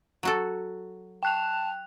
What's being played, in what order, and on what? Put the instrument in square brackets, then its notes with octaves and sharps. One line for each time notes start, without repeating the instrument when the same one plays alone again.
[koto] F#3 F#4 A4
[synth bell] G5 F#6 F7 [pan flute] A5